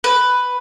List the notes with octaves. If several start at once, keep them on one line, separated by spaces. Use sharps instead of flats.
B4